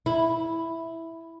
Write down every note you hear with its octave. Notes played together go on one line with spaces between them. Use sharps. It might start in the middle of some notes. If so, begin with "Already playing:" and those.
E4